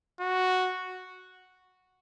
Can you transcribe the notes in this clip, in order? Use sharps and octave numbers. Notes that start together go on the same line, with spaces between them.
F#4